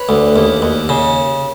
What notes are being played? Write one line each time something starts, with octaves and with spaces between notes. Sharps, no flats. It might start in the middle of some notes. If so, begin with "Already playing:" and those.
Already playing: B4 C#5
D2
D#2
D#2
C#3